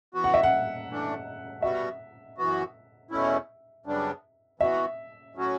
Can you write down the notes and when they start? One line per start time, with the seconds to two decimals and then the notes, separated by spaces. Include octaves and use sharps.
0.14 E3 B3 F#4
0.24 F#5
0.34 E5
0.43 F#5
0.89 E3 A3 D4
1.62 B2 G3 B3 F#4 E5
2.38 F#2 E3 B3 F#4
3.11 E2 B2 A3 C#4 E4
3.86 F#2 C#3 G3 B3 D4
4.60 E3 B3 F#4 E5
5.35 A2 F#3 C#4 F#4